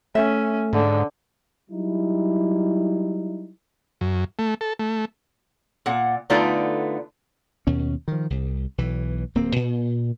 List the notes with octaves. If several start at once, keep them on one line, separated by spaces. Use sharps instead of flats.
A3 C#4 E5
G#2 D3
F#3 G3 D#4 E4
F#2
A3
A4
A3
A#2 F#5
D3 A3 B3 D#4 F4 D5
D#2 B2 C#4
D#3 F3
C2
B1 E3
D1 A#3 C4
A#2